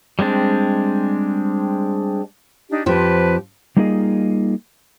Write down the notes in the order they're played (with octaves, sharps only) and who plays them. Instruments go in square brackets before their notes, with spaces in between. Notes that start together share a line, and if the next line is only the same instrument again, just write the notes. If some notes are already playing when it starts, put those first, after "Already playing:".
[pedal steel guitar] G3 G#3 C4 D4
[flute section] D4 D#4 G4
[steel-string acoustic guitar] F2 F3 [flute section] G4 B4 A5
[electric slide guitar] G3 A#3 D#4 F4 G#4 D#5